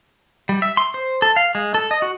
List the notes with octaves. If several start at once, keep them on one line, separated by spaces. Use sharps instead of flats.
G3
E5
C6
C5
A4
F5
G#3
A4
D#5
F#4